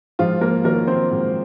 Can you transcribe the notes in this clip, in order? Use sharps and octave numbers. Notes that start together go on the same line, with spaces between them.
G#2 F3 F4
A#3 A#4
D#3 F#3 A#3 A#4
C4 C5
G#2